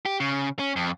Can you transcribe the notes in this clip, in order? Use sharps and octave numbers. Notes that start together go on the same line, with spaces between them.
G4
C#3
C#4
F2